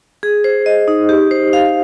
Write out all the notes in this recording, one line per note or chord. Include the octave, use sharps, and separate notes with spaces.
G#4
C5
D#5
D#4
G4
C5
F5